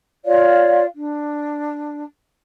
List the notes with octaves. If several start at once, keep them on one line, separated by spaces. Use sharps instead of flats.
F4 C#5 D5 F5
D4